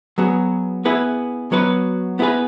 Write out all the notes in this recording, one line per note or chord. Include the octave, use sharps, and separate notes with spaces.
F#3 B3 G#4
B3 E4 G#4 B4
F#3 B3 F#4 B4
B3 E4 G#4 B4